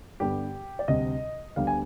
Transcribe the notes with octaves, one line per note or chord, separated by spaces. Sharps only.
G2 D3 G3 B3 G4
D5
D2 C3 G3 C4 D#5
D2 D3 G3 B3 F5
G#5